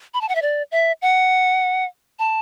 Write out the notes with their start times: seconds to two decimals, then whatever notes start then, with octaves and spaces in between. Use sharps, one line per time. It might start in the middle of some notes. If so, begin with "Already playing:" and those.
0.14 B5
0.21 A5
0.29 F#5
0.35 E5
0.42 D5
0.72 E5
1.02 F#5
2.19 A5